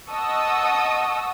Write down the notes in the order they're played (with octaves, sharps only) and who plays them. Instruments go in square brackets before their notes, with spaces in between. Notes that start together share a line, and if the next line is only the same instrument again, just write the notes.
[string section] D#5 F#5 A5 C#6 D#6 E6